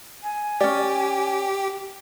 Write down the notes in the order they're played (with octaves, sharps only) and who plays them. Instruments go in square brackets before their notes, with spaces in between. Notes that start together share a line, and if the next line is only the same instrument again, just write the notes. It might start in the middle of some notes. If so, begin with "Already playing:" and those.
[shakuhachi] G#5
[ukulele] C#4 D5 [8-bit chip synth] G4